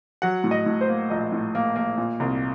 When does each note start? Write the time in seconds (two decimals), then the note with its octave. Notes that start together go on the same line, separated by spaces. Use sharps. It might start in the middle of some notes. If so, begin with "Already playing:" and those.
0.22 F#3 F#5
0.44 A2
0.51 D#5
0.66 A2
0.81 C5
0.88 A#3
1.10 A#1 D#5
1.32 A2
1.55 A#3
1.76 A#3
1.97 A#2
2.20 C2